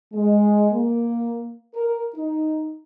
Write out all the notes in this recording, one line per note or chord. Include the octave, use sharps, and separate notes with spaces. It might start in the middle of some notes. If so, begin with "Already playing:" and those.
G#3
A#3
A#4
D#4